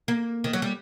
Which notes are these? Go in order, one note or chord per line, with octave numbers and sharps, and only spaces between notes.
A#3
D#3
F#3
G3